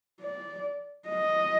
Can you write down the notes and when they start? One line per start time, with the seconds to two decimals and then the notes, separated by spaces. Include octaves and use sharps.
0.22 D5
1.09 D#5